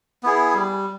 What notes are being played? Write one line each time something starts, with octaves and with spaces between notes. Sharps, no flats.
B3 E4 G#4
G3